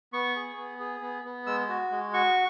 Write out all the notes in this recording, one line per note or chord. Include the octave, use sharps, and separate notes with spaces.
B3 C#6
G#4
B3
G#4
B3
B3
G#3 E6
F#4
G#3
F#4 C#6